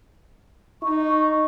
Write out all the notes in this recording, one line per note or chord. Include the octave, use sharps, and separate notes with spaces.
D#4 C#6